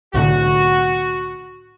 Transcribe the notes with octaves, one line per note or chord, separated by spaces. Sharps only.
C2 A2 D3 F#4